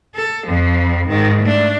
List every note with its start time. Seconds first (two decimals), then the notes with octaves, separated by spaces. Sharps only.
0.16 A4
0.47 F2 F3
1.08 G#2 D#3
1.42 A3 D4